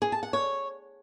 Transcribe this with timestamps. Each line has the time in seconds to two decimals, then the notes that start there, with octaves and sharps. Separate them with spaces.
0.02 G#4
0.12 A5
0.23 F#5
0.33 C#5